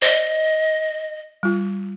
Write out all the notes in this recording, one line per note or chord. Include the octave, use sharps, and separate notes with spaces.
C5 D5 D#5
G3 F4